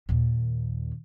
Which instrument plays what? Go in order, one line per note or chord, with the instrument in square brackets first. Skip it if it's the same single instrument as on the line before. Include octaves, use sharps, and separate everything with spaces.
[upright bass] D#2 A#2